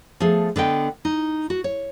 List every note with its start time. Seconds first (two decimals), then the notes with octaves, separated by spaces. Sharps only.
0.20 F3 A3 B3 G#4
0.56 D3 B3 D#5 G5
1.05 D#4
1.50 F#4
1.64 C#5